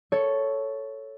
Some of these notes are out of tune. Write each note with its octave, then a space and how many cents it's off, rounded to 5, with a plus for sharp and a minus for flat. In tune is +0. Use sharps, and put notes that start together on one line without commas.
A4 +0 C#5 +5